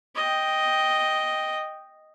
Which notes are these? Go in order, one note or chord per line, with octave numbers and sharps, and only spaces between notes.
D#5 G5